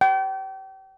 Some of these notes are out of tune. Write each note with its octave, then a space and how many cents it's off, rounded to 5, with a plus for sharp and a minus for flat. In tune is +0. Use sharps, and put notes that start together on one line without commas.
G5 -35